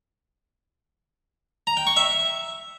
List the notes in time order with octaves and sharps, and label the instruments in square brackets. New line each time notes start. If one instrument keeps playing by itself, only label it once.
[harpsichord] A#5
G5
C#6
E5